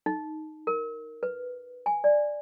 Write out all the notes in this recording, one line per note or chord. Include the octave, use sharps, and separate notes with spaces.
D#4
A#4
B4
G#5
D5